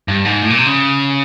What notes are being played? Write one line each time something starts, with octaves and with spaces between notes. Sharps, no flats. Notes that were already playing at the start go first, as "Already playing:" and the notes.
G2
G#2
A2
A#2
C3
C#3